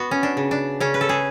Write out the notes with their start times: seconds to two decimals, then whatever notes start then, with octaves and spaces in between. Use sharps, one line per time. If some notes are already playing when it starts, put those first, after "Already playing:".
Already playing: B3 F#4
0.11 C#4
0.23 D4
0.37 C#3
0.51 D4
0.80 C#3 C#4
0.94 B4
1.01 A4
1.09 G#4